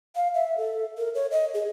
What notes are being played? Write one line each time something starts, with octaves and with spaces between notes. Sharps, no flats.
F5
E5
A4
A#4
C#5
D#5
G#4